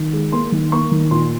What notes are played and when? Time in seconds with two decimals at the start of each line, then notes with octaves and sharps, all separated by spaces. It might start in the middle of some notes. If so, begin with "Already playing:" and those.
Already playing: D#3
0.13 G#3
0.32 A#3 C6
0.52 D#3
0.72 A#3 C#6
0.91 D#3
1.11 A#2 C6